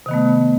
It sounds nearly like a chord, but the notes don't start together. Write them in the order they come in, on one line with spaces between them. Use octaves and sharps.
C3 D#3 B3 A3